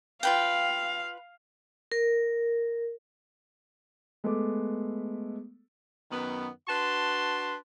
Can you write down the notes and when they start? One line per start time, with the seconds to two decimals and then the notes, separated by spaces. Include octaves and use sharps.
0.23 F4 B4 F5 G5
1.92 A#4
4.24 G#3 A3 B3 A4 B4 D6
6.11 F#2 D#3 B3
6.68 D4 F#4 B4 A5 C6